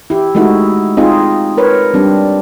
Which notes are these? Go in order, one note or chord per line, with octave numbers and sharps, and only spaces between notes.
E4 G4
G#3 A3 D#4 E4 F#4
C4 D#4 F4 G#4
A#4 B4 C#5
G3 C4 D4